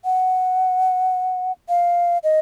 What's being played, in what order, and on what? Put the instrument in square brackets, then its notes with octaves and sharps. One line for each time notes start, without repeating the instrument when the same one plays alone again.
[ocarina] F#5
F5
D#5